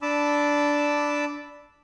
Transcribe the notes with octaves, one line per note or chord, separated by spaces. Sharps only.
D4 A5 B5 D6 E6